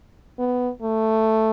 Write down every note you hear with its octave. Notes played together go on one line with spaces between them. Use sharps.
B3
A3